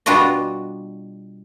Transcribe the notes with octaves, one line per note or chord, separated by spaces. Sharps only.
B2 G3 D4 F4 F#4 D#5